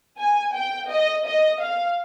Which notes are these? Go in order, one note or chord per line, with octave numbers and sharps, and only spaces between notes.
G#5
G5
D#5
D#5
F5